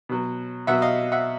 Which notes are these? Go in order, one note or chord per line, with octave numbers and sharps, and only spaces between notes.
B2 F#3
B2 F#3 E5 F#5
D#5 F5
E5 F#5